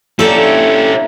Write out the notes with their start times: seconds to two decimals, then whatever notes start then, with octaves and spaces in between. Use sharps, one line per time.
0.19 A#3 C#4 D4 E4 G4 A4 E5